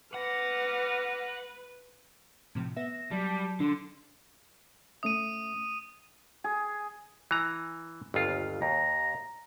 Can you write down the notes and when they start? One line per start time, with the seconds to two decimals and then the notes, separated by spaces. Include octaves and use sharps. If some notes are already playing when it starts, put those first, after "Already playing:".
0.14 B4 F#5 D6 F6 A#6
2.55 A2 C3 F3
2.76 B3 E5 A#6 E7
3.11 F#3 G3 A5
3.60 D3 D4 C6
5.03 A3 C#4 E5 D#6 D#7
6.44 G#4
7.31 E3 A#5
8.14 G1 D#2 F4
8.62 D#2 A#5